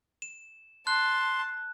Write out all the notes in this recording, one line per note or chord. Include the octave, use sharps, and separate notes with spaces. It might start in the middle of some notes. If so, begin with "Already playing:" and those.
E7
A5 C6 F#6